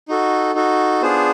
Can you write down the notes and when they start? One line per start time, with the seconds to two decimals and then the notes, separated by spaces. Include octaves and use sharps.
0.09 D#4 F#4 A4
0.55 D#4 F#4 A4
1.02 B3 D4 F4 G#4 C5